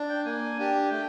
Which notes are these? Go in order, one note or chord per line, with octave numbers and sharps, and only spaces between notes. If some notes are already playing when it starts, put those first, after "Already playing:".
Already playing: D4
G5
A#3 G#5
D4 G4
A3 G5